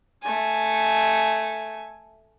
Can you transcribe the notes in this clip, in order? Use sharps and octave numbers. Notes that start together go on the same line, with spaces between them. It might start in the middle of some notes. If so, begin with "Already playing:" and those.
A3 G#5